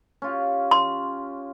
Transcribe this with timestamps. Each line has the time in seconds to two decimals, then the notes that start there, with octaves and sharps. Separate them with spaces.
0.22 C#4 F4 G4
0.71 C6